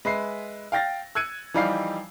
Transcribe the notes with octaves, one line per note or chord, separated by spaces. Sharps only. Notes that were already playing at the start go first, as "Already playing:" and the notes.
G#3 B4 E5 C7
F5 G5 A6 A#6
E6 F#6 G#6 C#7 D#7
E3 F3 G3 D#4 F5 C7